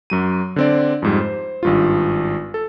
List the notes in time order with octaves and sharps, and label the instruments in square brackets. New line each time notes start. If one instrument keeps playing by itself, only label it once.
[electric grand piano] F#2 F#3 D#7
D3 C4 D5
F2 G#2 G3
C5
G#1 G2 F4
A4